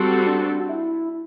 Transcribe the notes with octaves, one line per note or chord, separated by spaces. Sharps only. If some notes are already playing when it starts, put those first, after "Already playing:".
Already playing: G3 C4 F#4 A4
D4
F#4
E4